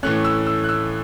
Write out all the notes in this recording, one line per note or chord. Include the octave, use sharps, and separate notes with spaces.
A2 E3 A3 C#4 F#6
E6
E6
F#6
E6